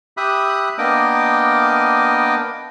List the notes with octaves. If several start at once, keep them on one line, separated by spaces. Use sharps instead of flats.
G4 E5 B5 D#6 F#6
A#3 B3 D4 D#5 G5 D6